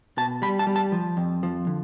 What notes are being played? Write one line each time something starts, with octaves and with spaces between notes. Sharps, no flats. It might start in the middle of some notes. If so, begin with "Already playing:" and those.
B2 A5
G3 B5
A5
G3
A5
F3
F2
F3
D3